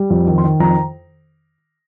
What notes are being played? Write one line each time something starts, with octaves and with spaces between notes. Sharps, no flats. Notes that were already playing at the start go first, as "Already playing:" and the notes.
Already playing: G3
F2
D#3
C6
D#3
F2 A#5